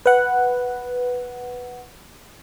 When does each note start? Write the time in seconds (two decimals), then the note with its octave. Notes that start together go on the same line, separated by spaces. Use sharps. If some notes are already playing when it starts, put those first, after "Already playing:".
0.06 B4 F#5